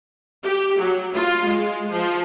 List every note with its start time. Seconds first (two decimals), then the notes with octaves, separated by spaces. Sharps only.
0.43 G4
0.79 F#3
1.14 F4
1.47 G#3
1.91 F3